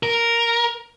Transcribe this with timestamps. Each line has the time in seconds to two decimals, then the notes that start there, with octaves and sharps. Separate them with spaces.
0.03 A#4